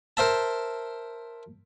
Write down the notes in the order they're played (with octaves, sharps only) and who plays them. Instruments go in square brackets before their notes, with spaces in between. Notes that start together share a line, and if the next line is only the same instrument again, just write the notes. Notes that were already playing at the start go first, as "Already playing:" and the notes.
[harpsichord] A#4 C5 E5 A5